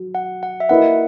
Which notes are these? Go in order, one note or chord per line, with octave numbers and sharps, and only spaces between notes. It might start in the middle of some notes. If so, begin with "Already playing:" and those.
Already playing: F#3
F#5
F#5
E5
A#3 E4 B4 D#5 F#5